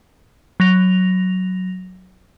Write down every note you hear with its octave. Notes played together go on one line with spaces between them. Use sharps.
F#3 A#6 F7